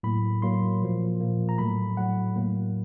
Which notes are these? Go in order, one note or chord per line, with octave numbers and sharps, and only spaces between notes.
A2 F#3 A#3 B5
A2 F#3 A#3 C6
A#2 F3 A#3
A#2 F3 A#3
A#5
A2 F#3 A3 B5
A2 F#3 A3 F#5
A2 F#3 A#3